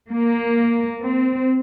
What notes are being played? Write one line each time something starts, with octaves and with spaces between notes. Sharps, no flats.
A#3
C4